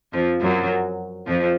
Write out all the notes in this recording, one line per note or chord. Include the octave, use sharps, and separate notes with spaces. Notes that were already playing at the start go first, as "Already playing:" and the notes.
F2 F3
F#2 F#3
F2 F3